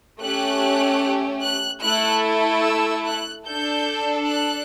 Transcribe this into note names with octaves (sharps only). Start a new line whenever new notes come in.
A3 C#4 G4 F#6
F#6
A3 E4 A4 F#6
E6
F#6
D4 A4 G6
F#6